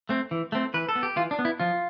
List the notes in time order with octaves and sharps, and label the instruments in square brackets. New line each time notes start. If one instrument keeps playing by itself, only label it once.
[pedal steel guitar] A3 C4
E3
A3 C4
E3 B4
A4
B3
G4
E3 F4
D4
B3
E4
F3 F4